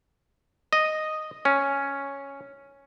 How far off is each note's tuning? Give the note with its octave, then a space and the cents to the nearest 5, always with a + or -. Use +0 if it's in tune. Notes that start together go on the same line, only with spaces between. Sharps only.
D#5 -5
C#4 +0